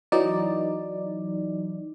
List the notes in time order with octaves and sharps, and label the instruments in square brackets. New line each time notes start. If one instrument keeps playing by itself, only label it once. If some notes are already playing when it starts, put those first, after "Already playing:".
[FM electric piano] E3 F#3 D#4 D5